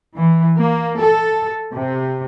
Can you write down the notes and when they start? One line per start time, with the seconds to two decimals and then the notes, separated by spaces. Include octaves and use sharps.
0.15 E3
0.58 A#3
0.99 A4
1.73 C3